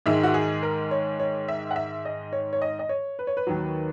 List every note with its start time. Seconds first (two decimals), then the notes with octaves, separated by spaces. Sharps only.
0.06 G#2 D#3 G#3 E5
0.23 F#4
0.34 G#4
0.63 A#4
0.91 C#5
1.20 C#5
1.48 E5
1.71 F#5
1.76 E5
2.05 D#5
2.33 C#5
2.53 C#5
2.62 D#5
2.79 D#5
2.89 C#5
3.19 B4
3.27 C#5
3.37 B4
3.47 D#2 D#3 F#3